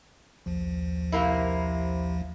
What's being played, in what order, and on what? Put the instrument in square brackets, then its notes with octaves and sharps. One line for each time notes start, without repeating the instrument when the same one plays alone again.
[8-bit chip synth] A#1 D#2 F3
[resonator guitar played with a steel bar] C3 A#3 E4